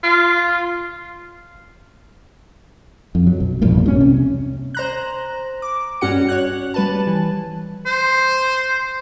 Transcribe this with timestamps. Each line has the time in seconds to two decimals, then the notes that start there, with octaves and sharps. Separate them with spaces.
0.04 F4
3.15 F2
3.27 F#3
3.40 B1
3.61 A#1 E2 G2 A#3
3.84 C2 F3 C#4
4.01 C3
4.75 C5 A#5 F#6
5.62 D6
6.01 G2 C#4 F#4 F#5 C#7
6.29 C#5 F#6
6.74 G3 B4 A5
7.07 E3
7.86 C5